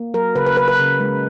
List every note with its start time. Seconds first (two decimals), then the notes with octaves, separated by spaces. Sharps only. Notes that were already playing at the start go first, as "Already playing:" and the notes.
Already playing: A#3
0.14 F#3 A#4
0.35 C#3 B4
0.46 B4
0.57 C#3 B4
0.68 B4
0.79 C#3
1.00 G#3